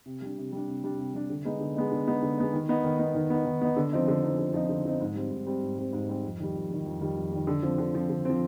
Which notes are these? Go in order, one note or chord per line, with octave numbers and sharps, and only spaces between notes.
C3
G3 D4
C3
G3 D4
C3
G3 D4
C3
G3 D4
D3
G#3 B3 D#4
D3
G#3 B3 D#4
D3
G#3 B3 D#4
D3
G#3 B3 D#4
D#3
B3 D#4
D#3
B3 D#4
D#3
B3 D#4
D#3
B3 D#4
D3
F3 C4 D#4
D3
F3 C4 D#4
D3
F3 C4 D#4
D3
F3 C4 D#4
G#2
G3 C4
G#2
G3 C4
G#2
G3 C4
G#2
G3 C4
F2
D#3 G3
F2
D#3 G3
F2
D#3 G3
F2
D#3 G3
D3
F3 C4
D3
F3 C4
D3
F3 C4